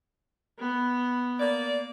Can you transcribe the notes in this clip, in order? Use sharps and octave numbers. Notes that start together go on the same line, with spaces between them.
B3
A#3 D5